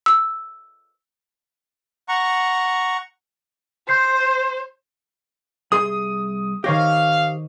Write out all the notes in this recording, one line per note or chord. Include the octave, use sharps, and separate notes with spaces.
E6
F#5 A#5 C#6
C5 C6 G6 C7
C2 G#4 C6 D#6
D#3 G4 C5 C#5 F5 A#6